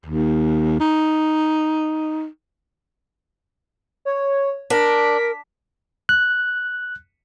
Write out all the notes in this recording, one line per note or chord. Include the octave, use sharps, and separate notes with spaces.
D#2
D#4
C#5
D4 A#4 B6
F#6